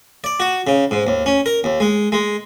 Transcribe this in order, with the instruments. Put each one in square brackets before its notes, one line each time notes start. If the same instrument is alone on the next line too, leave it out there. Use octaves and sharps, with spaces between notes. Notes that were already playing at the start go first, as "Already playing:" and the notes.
[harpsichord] D5
F#4
C#3
G#2
D#2
C#4
A#4
D#2
G#3
G#3